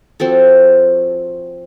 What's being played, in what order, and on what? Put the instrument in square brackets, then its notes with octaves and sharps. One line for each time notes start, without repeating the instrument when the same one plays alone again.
[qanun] F3 C4 F#4 A4